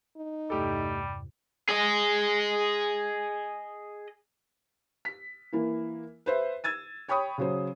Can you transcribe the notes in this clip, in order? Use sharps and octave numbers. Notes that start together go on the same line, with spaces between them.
D#4
E2 G2 C3 G3 A3 G4 A4
G#4 D#5
B6
E3 A#3 E4
B4 C5 E5
E6 G#6 A6 D#7
C#5 G5 B5 C#6 D#6
C#3 F#3 C5